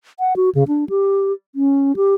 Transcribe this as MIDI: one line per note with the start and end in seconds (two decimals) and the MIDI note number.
0.19 0.36 78
0.36 0.50 66
0.55 0.64 49
0.68 0.85 62
0.89 1.32 67
1.55 1.96 61
1.96 2.15 67